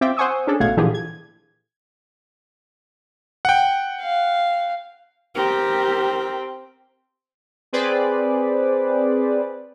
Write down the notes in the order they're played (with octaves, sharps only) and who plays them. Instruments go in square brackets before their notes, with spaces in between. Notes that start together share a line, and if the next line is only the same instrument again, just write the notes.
[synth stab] C4 F4 E5 G5 D6
C5 F#5 G#5 C#6 D#6 E6
C#4 D4 G#4 A4
A1 B2 A3 F5 F#5 G#6
A#2 D3 E3 F3 G4 G#4
G#6
[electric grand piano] F#5 G5
[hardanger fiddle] F5
[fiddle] C4 [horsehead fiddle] G4 A#4
[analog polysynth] C4 G#4 B4 C5 D5